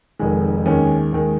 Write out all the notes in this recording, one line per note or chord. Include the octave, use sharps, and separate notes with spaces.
F1 F2 D#3 G#3
D#2 D#3 G#3 C#4
D#2 D#3 G#3